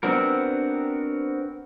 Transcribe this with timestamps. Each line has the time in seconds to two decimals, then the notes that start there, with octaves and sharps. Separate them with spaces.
0.03 B3 C4 D4 F#4 A#4